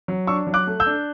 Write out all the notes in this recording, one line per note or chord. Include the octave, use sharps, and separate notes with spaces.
F#3
D4 C#6 E6
F#3
D6 F#6
A3
E6 G6
D4